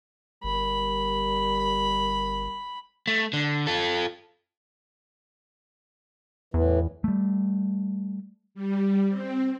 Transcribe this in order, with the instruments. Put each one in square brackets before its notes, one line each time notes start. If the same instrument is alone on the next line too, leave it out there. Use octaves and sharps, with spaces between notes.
[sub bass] G1 [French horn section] G3 A#4 [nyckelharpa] B5
[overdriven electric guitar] A3
D3
F4 A4
[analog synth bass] E2 [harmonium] A2 E3
[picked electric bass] G3 A3
[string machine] G3
C4